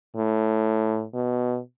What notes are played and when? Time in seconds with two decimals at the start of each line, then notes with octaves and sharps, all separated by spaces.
0.16 A2
1.15 B2